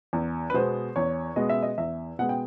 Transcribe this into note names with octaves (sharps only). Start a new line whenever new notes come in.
E2
B4
B2 G#3 B3 C5
E2 C#5
B2 G#3 B3 D#5
E5
D#5
E2 E5
B2 G#3 B3 F#5
G5